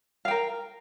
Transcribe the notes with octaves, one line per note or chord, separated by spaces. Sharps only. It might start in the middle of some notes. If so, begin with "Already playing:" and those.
A#4 F5 G5